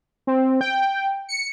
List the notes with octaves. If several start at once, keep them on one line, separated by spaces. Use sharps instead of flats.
C4
G5
C#7